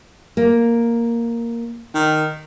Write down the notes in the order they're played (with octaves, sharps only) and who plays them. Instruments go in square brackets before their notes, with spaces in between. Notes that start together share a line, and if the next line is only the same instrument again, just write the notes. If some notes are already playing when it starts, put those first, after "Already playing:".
[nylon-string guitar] A#3
[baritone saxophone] D#3